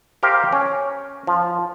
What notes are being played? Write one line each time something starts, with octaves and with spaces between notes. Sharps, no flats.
G4 A#4 C5 F5 G5
C#4
F3